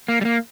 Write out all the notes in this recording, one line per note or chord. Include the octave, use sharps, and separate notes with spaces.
A#3
G3
A#3